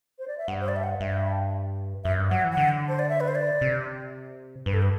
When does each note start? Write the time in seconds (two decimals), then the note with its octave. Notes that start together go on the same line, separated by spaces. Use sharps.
0.19 C5
0.28 D5
0.38 E5
0.48 G2 F#5
0.61 C5
0.68 D5
0.76 E5
0.83 F#5
1.00 G2 E5
2.04 F#2 E5
2.18 G2
2.31 F#3 F#5
2.44 E3
2.52 F#5
2.57 D3
2.89 C5
2.99 D5
3.09 E5
3.20 B4
3.28 C5
3.35 D5
3.61 C3
4.66 G2 B4
4.74 A4
4.82 B4